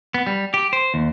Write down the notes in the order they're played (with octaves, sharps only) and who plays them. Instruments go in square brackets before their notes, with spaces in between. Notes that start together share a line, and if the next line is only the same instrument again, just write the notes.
[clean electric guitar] B3
G3
G4
C5
D#2